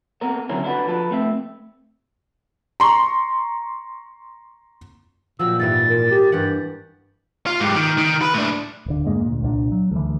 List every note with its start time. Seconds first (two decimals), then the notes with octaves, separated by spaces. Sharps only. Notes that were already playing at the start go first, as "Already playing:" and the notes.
0.21 B3 C4 A4 A#4
0.49 D3 F#3 C4 C#4 E4 A#4
0.64 D4 E4 F#4 A4 B4
0.87 F3 A4 B4
1.11 A3 C4 E5
2.80 A#5 C6 C#6
5.39 A#2 F3 F#3 C4 E6
5.60 G#2 E3 G3 A6
5.89 A#4
6.11 G4
6.32 G2 E3 G4 F#5
7.46 F4
7.60 G#2 G4
7.75 D#3
7.98 D#3
8.22 B4
8.34 A2 D4
8.86 D1 D3
9.05 F2 G#2 G#3 A#3
9.21 D2 A#2
9.42 C2 A#2 A3 D4
9.72 F#3
9.91 D2 E3